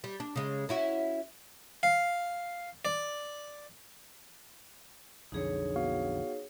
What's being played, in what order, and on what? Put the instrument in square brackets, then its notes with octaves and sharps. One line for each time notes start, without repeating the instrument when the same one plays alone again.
[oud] G3
D4
C#3 G#3
C#4 E4 F#4
[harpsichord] F5
D5
[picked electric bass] B1 F2 D3 [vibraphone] D#4 G#4 C#5
[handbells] B3 F#4 F5